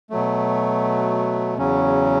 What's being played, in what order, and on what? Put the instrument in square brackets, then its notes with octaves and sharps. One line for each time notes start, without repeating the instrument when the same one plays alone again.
[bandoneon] B2 F#3 A3
E2 C#3 F#3 C#4